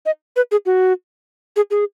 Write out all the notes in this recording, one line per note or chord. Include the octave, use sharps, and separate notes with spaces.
D#5
B4
G#4
F#4
G#4
G#4